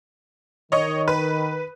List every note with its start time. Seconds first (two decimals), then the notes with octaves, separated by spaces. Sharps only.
0.72 D#3 C#5 D#5 C#6
1.08 B4